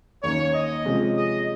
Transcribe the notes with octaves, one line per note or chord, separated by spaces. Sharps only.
D#2 D#3 A#3 C#4 C#5
D#5
C3 F3 G#3 C#4
D#5